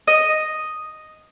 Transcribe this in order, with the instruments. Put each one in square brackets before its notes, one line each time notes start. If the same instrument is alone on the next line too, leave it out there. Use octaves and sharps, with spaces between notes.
[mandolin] D#5